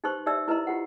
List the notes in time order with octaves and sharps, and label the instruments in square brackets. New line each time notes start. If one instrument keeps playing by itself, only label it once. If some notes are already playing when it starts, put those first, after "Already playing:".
[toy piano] D#4 G4 B4 C5 C6 C#6
D#4 G4 D5 E5 E6
E4 B4 D#5 A#5 C6
F4 G4 F#5